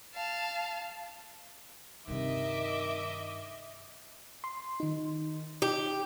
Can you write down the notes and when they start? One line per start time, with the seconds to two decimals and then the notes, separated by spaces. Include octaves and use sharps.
0.14 F5 A5
2.07 G2 C3 D#3 D#5 E5 D6
4.44 C6
4.80 D#3 D#4
5.62 D#4 G4